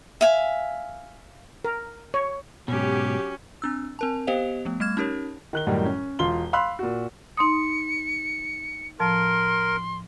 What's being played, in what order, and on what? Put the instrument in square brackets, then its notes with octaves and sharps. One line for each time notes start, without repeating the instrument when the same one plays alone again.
[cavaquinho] E5 F5 G#5
[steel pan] A#4
C#5
[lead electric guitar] G#2 B2 [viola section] F#3 G4 [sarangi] C#4
[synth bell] C4 D4 E6
C4 A#4 A5
B3 G4 C5 D#5 F5 F7
F3 A3 B3
G3 A3 F6 G#6 E7
C#4 D#4 G4 A#4 C#5
[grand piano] D#3 F#6 G7
F#2 A2 D#3 G3
C#4
E1 F4 C6 G7
F5 B5 C6 E6 F#6
A#2 F#4
[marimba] D#4 C6 D#6 [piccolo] C#7
[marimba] A2 F3 A5 [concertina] A#4 [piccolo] C6